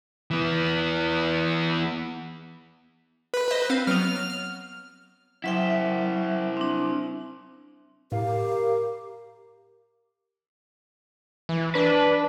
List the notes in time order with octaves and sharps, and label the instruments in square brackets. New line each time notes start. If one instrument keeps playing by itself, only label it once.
[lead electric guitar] E3 B3
[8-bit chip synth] B4
[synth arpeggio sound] C5 D#5
C4 F5
[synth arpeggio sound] F#3 B3 [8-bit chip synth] F6
[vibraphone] F#3 E5 G5 [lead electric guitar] E4 C5
[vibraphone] C4 D4
[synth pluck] A2 [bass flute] G4 [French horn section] A#4 [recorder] F5
[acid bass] E3
[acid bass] D4 [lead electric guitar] B4